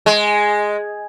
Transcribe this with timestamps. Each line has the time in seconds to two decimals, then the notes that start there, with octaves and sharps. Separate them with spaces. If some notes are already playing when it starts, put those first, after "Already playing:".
0.06 G#3